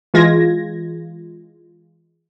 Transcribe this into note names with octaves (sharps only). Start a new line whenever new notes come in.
E3 G#3 F4 G#6 A#6